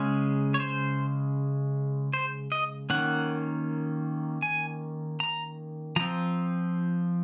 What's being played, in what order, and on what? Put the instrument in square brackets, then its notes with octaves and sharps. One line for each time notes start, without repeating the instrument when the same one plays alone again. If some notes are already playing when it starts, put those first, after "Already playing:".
Already playing: [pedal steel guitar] C#3 G#3 C#4
C#5
C5
C5
D#5
D#3 A#3 C#4 F#5
G#5
A#5
F3 C4 A#5